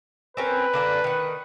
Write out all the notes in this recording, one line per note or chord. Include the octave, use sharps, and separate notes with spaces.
C4 C#4 A#4 B4
D3 A#3 D4
D#3 F#5